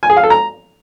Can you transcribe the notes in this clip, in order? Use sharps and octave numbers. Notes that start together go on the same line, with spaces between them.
G#5
G#4
F5
A4
A#5